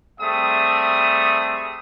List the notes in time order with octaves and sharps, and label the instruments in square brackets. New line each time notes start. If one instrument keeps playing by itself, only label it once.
[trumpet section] G3 A3 C4 G#4 E5 D#6